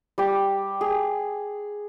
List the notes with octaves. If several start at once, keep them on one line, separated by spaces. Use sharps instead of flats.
G3 G4
G#4